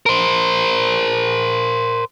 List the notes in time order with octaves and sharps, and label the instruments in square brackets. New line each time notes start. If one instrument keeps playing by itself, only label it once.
[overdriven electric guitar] A#4 C5